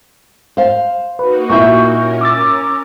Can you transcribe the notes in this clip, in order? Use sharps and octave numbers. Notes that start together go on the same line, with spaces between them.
C5 F5
A#3 D#4 F#4 B4
A#2 E4 E5 C#6 G6
C#4 A#4
D6 E6 A6